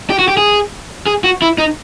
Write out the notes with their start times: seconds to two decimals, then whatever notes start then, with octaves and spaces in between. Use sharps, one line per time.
0.10 G4
0.19 F#4
0.28 G4
0.37 G#4
1.06 G#4
1.24 F#4
1.42 E4
1.58 D#4